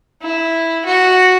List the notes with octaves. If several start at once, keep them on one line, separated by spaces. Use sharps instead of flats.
E4
F#4